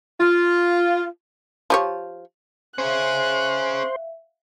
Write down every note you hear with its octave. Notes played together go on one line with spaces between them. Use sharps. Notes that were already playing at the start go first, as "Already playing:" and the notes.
F4
F3 G4 C#5
C#4 G#4 C5 E5 F5 F#6